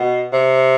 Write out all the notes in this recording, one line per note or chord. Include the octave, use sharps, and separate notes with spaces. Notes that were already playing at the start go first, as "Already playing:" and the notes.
Already playing: B2
C3